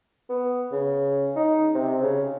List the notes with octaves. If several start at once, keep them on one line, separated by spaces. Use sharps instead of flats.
B3
C#3
D#4
C3
C#3